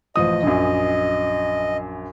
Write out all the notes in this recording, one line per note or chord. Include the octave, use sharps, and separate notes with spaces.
A1 F3 D#5 D#6
A#1 F#2